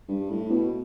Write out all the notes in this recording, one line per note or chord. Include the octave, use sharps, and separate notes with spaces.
G2
A2
B2